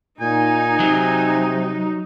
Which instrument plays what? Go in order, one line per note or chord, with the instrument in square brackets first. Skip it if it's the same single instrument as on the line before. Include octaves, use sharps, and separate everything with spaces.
[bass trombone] A#2 [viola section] D#4 [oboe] G#5
[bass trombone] C3 [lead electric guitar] F#3